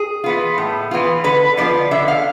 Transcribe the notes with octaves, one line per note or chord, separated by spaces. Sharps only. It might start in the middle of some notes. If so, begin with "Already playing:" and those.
Already playing: G#4
E3 B3 F4
A2
E3 B3 F4
D3 B4
F3 B3 F4 D5
D3 E5
F5